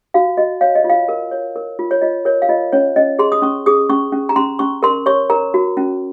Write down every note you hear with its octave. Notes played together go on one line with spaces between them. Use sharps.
F#4 F5
F#4 D#5
C#5 F5
D#5
F4
F5
A#4
C#5
A#4
F4
C#5
F4 D#5
A#4 C#5
F5
F4 D#5
C#4 C#5
C#4 D#5
G#4 C6
D#6
C#4 C#6
G#4 D#6
C#4 C#6
C#4
A#5
C#4 C6
C#4 C#6
A#4 C6
C#5 C#6
A#4 A#5
F#4
C#4